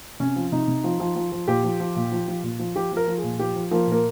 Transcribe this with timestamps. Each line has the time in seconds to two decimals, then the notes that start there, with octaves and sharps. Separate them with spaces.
0.20 C3 C#4
0.36 F3
0.52 C3 D#4
0.68 C3
0.84 F3
1.00 F3
1.16 F3
1.32 F3
1.48 A#2 G4
1.64 F3
1.80 F3
1.96 A#2
2.12 F3
2.28 F3
2.43 A#2
2.59 F3
2.75 F3 G4
2.92 F3 A#4
3.07 F3
3.18 G#4
3.23 A#2
3.39 F3 G4
3.56 F3
3.71 F3 A#3
3.87 A#2 A#3